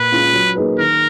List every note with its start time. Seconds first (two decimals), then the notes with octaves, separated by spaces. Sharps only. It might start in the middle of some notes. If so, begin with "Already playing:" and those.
Already playing: A#2 B4
0.12 G#3 C#4 F4
0.33 F#3
0.55 A#3 D#4 G#4 B4
0.78 D#3 A#4